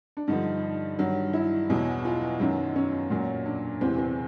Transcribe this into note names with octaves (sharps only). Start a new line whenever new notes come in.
D4
G2 D3 F3 D#4
G2 D#3 F#3
E4
E2 B2 F#3
F4
F#2 D#3 F#3
C#4
A#2 F#3
D4
E2 C3 E3 C4
C4